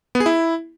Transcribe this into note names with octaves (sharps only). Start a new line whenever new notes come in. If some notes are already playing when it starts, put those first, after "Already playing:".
B3
G#4
E4